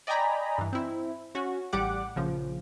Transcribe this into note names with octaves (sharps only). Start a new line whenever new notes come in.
D5 D#5 G5 G#5 A#5 B5
G2 E3
C4 E4
C#4 F#4
A1 G3 G4 F#5 D6
A#1 C#3 F3